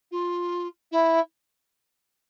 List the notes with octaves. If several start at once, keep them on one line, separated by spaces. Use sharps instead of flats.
F4
E4